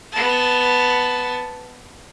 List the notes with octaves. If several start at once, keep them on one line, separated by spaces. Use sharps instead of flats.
B3 A5